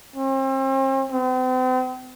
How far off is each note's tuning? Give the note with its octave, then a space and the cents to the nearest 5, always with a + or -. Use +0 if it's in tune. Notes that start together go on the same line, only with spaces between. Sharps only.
C4 +40
C4 -40